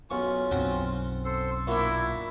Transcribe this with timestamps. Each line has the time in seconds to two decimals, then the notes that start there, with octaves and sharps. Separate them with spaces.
0.10 B1 C#4 F4 C#6
0.51 B1 F#2 C4 F#5 G5
1.25 A4 C5
1.67 A#2 D4 E4 F#4